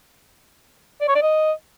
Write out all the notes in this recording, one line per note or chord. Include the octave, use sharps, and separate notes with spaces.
D5
C#5
D5
D#5